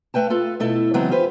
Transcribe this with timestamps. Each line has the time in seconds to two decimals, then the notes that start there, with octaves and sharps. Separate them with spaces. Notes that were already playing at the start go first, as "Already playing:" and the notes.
0.14 A3 B4 G5 A5
0.30 F4 A4 B4
0.60 B2 A3 E4 A4
0.94 C#3 E3 F#3 G#3 B3 C4
1.11 F4 G4 G#4 B4 C5